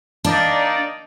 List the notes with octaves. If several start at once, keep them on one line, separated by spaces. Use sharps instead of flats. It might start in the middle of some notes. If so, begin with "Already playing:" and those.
A#3 D4 D#4 D5